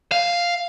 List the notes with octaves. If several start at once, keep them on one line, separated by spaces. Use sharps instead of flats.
F5